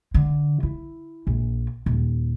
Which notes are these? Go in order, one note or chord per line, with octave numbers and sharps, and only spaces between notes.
D3
E4
A#1
D#1